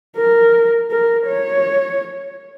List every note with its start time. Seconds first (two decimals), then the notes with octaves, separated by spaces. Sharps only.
0.17 A#4
0.91 A#4
1.26 C#5